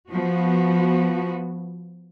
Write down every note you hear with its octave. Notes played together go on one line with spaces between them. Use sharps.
F3 B3 F#4